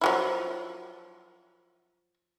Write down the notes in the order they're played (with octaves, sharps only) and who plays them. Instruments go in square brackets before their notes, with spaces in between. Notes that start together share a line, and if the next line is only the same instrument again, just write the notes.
[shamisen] F3 F#3 E4